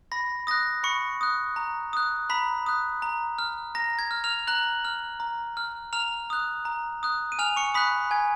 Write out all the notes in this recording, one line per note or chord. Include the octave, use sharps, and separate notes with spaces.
B5 A#6
D#6 F#6 A#6
B5 C#6 C#7
D#6 F#6
A#5
D#6 F#6
A#5 B5 B6
D#6 F#6
A#5
F6
A#5 A#6
G#6
F6
F6 F7
A#5 F#6 F#7
F6
A#5
F6
A#5 F6 F7
D#6 F#6
A#5
D#6 F#6
D#7
G#5 F6 F7
C#6 C#7
B5 D#6 F#6 B6
G#5 G#6